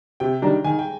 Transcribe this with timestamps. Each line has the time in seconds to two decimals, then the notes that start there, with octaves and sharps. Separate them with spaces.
0.20 C3 G5
0.42 D#3 G3 D4 A#5
0.64 D#3 G#5
0.79 G5